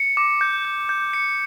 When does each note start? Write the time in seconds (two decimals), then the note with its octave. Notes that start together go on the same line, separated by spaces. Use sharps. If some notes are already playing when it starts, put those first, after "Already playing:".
Already playing: C#7
0.17 D6
0.41 G6
0.65 G6
0.89 G6
1.13 C#7